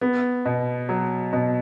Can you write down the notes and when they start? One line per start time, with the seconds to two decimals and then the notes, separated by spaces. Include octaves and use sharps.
0.01 B3
0.45 B2
0.89 F#3
1.33 B2